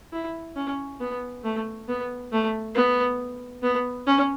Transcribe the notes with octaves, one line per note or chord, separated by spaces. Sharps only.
E4
C#4
B3
A3
B3
A3
B3
B3
C#4